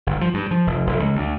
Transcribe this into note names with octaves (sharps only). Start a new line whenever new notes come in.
G1
F3
G2
F3
F1
F1
C#2
D2